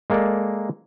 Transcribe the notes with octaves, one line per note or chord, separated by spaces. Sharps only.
G#3 A#3 A4 D5